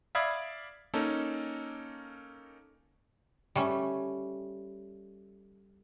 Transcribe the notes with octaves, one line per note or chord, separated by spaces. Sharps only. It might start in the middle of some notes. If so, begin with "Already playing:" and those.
D5 E5 F5 B5 D#6 G#6
A#3 C#4 D#4 A4
G3 A3 C#4